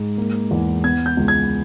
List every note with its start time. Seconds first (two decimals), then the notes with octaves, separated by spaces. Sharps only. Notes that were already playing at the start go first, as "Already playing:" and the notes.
Already playing: G#2
0.18 A#3
0.51 E2
0.84 B3 G#6
1.06 G6
1.17 C#2
1.28 G#6